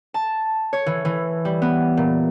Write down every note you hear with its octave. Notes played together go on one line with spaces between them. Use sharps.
A5
C#5
E3
E3
G3
B3
A#2